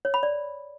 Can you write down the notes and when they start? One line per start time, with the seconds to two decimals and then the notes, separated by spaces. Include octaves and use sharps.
0.05 C#5
0.14 B5
0.23 D5